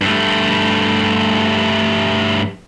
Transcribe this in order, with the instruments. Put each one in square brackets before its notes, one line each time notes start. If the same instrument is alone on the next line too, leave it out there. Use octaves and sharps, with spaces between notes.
[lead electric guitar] G2 A3